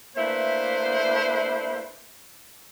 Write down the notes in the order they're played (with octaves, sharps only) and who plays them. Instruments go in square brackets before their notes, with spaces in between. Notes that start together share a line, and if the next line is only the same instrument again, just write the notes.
[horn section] A3 A#3 D4 E4 B4 C5